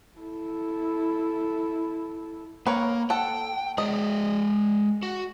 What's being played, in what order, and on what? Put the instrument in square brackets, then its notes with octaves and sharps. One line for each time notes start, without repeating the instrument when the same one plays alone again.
[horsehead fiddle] E4 A4
[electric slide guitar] A#3 [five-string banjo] A#4 B4 C#5
[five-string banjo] A4 F#5 [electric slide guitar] G5
[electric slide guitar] G#3 G#4 D5 [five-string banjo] D#5
[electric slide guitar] F#4